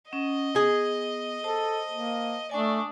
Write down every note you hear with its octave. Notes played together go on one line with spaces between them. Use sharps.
C#4 D#5 F#5
B3 G#4
A4 C5 A5
A#3
A3 D4 D5 G#5 C#6 D#6